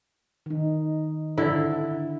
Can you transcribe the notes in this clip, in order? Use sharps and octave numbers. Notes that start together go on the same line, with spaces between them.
D#3 D#4
D3 E4